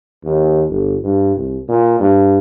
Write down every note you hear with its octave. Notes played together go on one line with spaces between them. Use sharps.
D#2
G1
G2
C2
A#2
G2